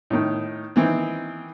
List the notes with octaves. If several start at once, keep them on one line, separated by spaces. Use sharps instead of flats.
A2 D#3
D#3 E3 C4